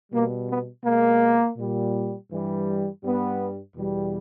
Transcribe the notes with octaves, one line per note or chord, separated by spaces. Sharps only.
B2 G3 A#3
B3
B2 G#3 A#3
A#2 G3
G2 E3 G3
G2 G3 B3
E2 B2 G3